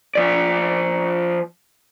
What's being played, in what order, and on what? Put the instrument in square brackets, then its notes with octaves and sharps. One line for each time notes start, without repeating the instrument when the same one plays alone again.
[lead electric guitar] F3 D5